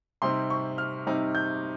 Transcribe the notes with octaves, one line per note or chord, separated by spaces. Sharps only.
C3 G3 C4 D#4 C6
C#6
F6
C3 G3 C4 D#4
G6